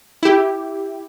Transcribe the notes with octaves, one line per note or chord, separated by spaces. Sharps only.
E4 G4